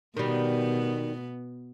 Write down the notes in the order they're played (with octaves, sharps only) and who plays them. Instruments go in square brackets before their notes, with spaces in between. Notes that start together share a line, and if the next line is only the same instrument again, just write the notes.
[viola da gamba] B2 B3 [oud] D#3 G3